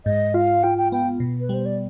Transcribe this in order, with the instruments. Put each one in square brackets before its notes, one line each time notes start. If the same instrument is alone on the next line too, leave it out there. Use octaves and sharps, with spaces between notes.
[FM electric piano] G#2 [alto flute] D#5
[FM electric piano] F4 [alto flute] F5
[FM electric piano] F4 [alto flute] G5
[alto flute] G5
[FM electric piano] B3 [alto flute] G5
[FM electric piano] B2
[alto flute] B4
[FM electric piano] G3 [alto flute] C5
[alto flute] D5